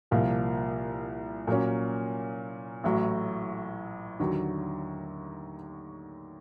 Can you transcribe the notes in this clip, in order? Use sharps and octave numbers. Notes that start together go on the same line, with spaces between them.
C2 A#2 F3 A#3
A#2 F#3 A#3 C#4
A1 A2 F#3
D#2 D3 F#3